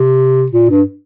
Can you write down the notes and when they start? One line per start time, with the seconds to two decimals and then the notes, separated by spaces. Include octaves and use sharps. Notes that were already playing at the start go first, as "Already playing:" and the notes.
Already playing: C3
0.52 A#2
0.70 G2